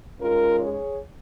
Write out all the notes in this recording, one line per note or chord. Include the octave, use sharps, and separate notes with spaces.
G#2 G#3 C#4 F4 A#4
G#4 C#5